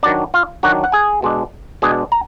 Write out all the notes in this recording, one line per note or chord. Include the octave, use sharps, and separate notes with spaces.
D#3 F#3 D4 D5
F4 F5
D#3 F#3 D4 F#4 F#5
F#5
G#4 G#5
B2 G#3 D4
B2 G#3 D4 G#4 G#5
A#5